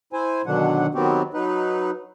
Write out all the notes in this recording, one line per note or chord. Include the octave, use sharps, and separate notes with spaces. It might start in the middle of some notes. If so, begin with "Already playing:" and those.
E4 C5 G#5
B2 D3 D#3 F#3 D4 F#5
D#3 F#3 B3 C4 F#4 G4
F#3 D#4 B4